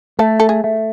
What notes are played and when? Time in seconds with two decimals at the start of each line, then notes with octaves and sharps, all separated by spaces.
0.19 A3 A4
0.40 A4
0.49 G#4
0.64 A3